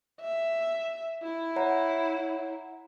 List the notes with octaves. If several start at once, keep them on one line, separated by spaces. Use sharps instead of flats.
E5
E4
C#5 F#5 A#5